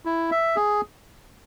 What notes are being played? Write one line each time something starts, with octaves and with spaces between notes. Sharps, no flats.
E4
E5
G#4